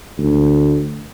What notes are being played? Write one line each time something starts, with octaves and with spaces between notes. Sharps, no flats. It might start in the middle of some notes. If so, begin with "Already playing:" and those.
D2